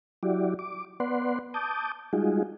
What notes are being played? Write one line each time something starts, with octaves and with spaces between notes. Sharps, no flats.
F#3 E4 F#4 G4 D5
D6
B3 B4 D5 F#5 C6
A5 D6 D#6 G6
G3 G#3 D#4 F4 F#4 G#4